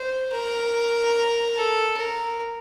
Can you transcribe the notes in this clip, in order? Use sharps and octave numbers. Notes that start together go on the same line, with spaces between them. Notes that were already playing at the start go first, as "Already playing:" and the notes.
Already playing: C5
A#4
A4
A#4